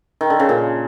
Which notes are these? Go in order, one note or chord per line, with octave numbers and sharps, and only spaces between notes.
D#3
D3
C#3
A#2